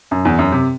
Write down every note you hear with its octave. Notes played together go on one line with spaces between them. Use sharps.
F#2
E2
F#2
C3